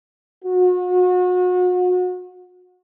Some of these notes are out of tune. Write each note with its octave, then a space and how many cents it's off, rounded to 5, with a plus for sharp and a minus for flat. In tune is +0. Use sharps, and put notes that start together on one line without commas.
F#4 -35